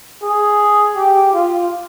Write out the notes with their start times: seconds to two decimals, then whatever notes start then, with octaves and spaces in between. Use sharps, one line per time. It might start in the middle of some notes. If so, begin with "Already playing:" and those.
0.22 G#4
0.96 G4
1.33 F4